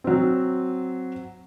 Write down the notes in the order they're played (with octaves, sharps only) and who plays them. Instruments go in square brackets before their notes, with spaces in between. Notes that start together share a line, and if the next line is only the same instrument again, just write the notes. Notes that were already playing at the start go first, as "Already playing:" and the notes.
[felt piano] F#3 C4